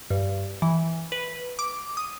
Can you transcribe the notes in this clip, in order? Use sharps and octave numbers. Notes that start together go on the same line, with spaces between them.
G2
E3
B4
D6
D#6